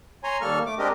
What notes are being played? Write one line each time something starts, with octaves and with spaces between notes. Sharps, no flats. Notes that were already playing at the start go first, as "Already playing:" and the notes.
C#5 G#5 A#5 C6
D#2 G3 A#3 A4 C#6 F6
A3 D6
G#3 C4 D4 G4 A#4 D#5